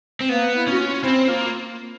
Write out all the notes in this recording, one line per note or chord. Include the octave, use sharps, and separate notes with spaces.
C4
A#3 B3
E4
C#4 F#4
F4
C4 E4
A#3 F4
F4